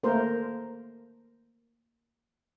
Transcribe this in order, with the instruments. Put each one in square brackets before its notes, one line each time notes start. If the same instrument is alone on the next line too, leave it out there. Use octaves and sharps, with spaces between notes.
[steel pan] A3 A#3 A#4 C5